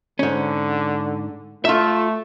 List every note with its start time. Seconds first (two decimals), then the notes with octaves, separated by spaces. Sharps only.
0.19 G#2 D3 C#4
1.65 A3 F4 E5